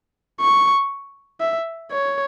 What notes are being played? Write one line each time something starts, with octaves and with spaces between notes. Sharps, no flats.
C#6
E5
C#5